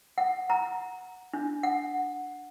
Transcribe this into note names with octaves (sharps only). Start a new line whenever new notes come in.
F#5
A#5
D4
F#5